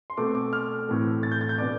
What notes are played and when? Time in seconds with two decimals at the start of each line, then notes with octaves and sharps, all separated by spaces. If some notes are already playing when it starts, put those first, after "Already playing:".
0.10 C6
0.17 B2 A3 C4 D6
0.35 D6
0.53 F6
0.88 A2 E3 A3 C4
1.23 A6
1.32 G6
1.41 A6
1.49 G6
1.58 B2 B3 D4 D6